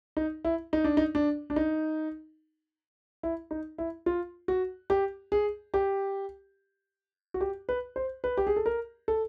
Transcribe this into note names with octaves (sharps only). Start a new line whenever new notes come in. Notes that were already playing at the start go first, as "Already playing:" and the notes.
D#4
E4
D#4
D4
D#4
D4
D4
D#4
E4
D#4
E4
F4
F#4
G4
G#4
G4
F#4
G4
B4
C5
B4
G4
G#4
A4
A#4
A4